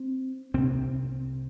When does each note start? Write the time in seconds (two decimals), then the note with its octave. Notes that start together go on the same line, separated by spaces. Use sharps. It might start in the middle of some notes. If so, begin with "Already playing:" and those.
Already playing: C4
0.54 C2 C3 C4